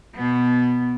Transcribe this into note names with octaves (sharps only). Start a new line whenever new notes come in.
B2 B3